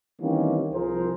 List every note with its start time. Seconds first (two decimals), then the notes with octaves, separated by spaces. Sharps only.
0.21 D#3 E3 G3 A#3 C4 C#4
0.73 C2 F3 G#4 A#4 C5